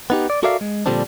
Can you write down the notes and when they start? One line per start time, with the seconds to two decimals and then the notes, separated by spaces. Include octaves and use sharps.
0.10 B3 D#4 G4
0.30 D5
0.43 F#4 A4 A#4 D5 E5 F5
0.61 G#3
0.86 A#2 D3 F3 G3 C4 D4